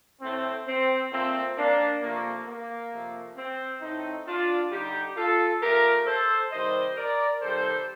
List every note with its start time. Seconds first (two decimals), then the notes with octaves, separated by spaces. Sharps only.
0.22 A2 A3 C4
0.67 C4
1.12 A#2 A3 C4
1.57 A#3 D4
2.02 C3 F3 A3 A#3
2.47 A#3
2.92 C3 F3 A3
3.37 C4
3.81 A2 A3 C4 D#4
4.27 D4 F4
4.71 D3 G3 D#4 G4
5.16 F4 A4
5.61 A#2 A3 G4 A#4
6.06 A4 C5
6.51 C3 D#3 G3 C5 D#5
6.97 A#4 D5
7.41 C3 D#3 G3 A4 C5